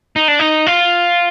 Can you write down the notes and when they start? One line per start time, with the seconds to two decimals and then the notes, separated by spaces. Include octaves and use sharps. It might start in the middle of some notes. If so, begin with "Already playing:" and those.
0.16 D#4
0.28 D4
0.39 D#4
0.66 F4